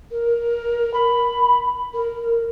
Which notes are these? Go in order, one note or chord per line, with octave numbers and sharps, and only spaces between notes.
A#4
B5
A#4